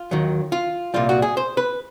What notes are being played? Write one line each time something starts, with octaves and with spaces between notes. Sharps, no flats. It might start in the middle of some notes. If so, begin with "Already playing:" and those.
Already playing: F4
D#2 D#3 F#3
F4
C2 A#2 G3 F4
F#4
G#4
C5
B4